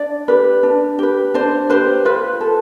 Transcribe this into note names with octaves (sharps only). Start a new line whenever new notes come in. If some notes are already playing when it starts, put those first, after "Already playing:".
Already playing: D4 D5
G4 B4
D4
G4 B4
D4 C5
G4 B4 C5
F4 B4
A4